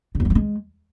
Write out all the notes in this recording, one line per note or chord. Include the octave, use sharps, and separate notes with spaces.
D3
E2
F#3
F3
G#3